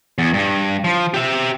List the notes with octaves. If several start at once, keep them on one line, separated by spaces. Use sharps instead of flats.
E2
G2
F3
G4 E5